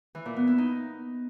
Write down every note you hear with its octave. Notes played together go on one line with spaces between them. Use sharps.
E3
A#2
B3
E4
D#4